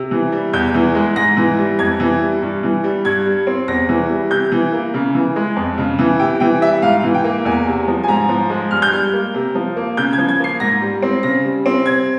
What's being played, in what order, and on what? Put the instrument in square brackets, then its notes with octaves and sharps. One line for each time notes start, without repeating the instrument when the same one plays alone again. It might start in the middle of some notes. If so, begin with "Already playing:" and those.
Already playing: [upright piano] C3
E3
G3
E2 G6
E3
G#3
G#2 A#6
E3
G3
F2 G#6
E3
G3
G2
E3
G3
G2 G#6
G3
C4
E2 A#6
E3
G3
C3 G6
E3
A#3
C#3
E3
G#3
F2
C#3
E3
C3 G5
E3 G5
G3 E5
G#2 F5
E3
G5
A#3
E2 G#5
C3
F3
G#5
G#2 A#5
F3
G#3
G2 F6
G6
G3 F6
A#3
C3
F3
A#3
C#3 G6
G#6
F3
G#6
A#3 C7
G#2 A#6
G3
C4
C#3 A#6
G3
C4
C3 G#6